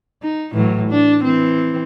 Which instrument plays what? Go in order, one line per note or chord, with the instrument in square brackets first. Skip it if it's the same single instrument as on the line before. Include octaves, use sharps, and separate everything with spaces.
[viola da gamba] D#4
A2 E3 F#3
D4
E3 C4